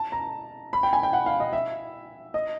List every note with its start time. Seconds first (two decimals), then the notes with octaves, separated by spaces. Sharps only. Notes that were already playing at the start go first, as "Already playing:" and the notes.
Already playing: A5
0.12 A#5
0.73 B5
0.83 G5
0.93 G#5
1.03 G5
1.13 F#5
1.26 F5
1.40 D#5
1.53 E5
2.34 D#5